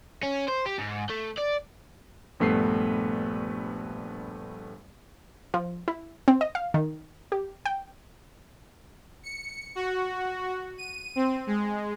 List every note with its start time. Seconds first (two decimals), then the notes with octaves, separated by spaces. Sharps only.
0.23 C#4
0.48 C5
0.66 G4
0.78 G#2
1.10 A3
1.38 D5
2.40 A#1 G2 A3 B3 B4 C7
5.54 F3
5.88 E4
6.28 C4
6.41 D#5
6.55 F5
6.74 D#3
7.32 G4
7.66 G5
9.23 C#7
9.75 F#4
10.77 D#7
11.16 C4
11.47 G#3